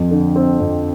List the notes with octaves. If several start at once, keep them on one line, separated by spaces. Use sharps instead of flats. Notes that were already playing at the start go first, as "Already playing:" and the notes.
Already playing: F2 F3
D3
C4
F2